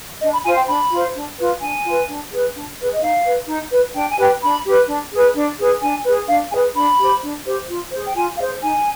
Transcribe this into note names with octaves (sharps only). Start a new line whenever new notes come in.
D4 D#5
B5
F4 C5 G#5
G5
D4 B5
F4 C5
D4
F4 B4
D4 G#5
F4 B4
D4
G#4 B4
D4
G#4 B4
D#5
D#4 F5
B4
D#4
B4
D4 G5
G#5
G4 B4 G5
D4 B5
G4 B4
D4
G#4 B4
D4
G#4 B4
D4 G#5
G#4 B4
D4 F5
G#4 B4 G#5
D4 B5
G4 C5
D4
G4 C5
F4
G#4 C5
G5
F4 G#5
G#4 C5 F5
D#4 G#5